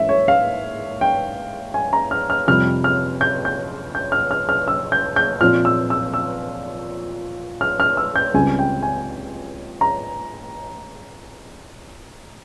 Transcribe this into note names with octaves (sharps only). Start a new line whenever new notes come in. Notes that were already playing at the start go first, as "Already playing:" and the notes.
Already playing: G#2 E3 A#3 C#4 E5
C#5
F5
G5
G#5
A#5
F6
F6
F2 C3 G3 F6
F6
G6
G6
G6
F6
F6
F6
E6
G6
G6
A#2 F3 C4 F6
E6
E6
E6
F6
F6
E6
G6
C#2 C#3 G3 C4 G#5
G5
G#5
A#5